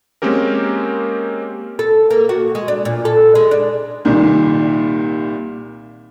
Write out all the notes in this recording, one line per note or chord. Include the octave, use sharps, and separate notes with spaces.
G#3 A#3 C4 C#4 G4 A#4
A4
A#3
F#4
G#3
D4
A#2
A4
G#3
D4
C2 A#2 D#3